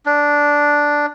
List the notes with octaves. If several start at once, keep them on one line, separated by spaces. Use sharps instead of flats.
D4